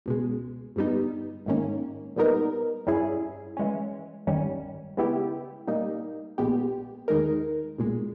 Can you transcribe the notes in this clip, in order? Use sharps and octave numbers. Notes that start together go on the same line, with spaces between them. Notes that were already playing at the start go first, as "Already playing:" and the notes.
C#2 B2 G#3
G1 G2 G3 B3 D#4
G#1 G#2 D#3 A#3 C#4
A#2 G3 B3 D#4 A#4
G2 G3 C#4 E4 G#4
E3 G#3 C#4
G#1 G2 D#3 G3 C#4
C#3 G#3 B3 E4 G4
A#2 G3 A#3 D#4
A#1 A#2 G#3 B3 G4
D#2 D#3 G#3 D#4 A#4
B1 A#2 G#3